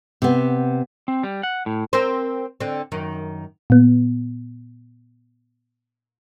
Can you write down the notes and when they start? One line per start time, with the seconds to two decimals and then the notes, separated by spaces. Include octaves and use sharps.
0.22 C3 B3
1.08 C4
1.23 G3
1.43 F#5
1.66 A2
1.93 C4 A#4 C5
2.60 D3 C4
2.92 F#2 D#3
3.70 A#2 B3